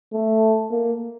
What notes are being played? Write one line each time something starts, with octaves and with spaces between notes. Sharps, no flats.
A3
A#3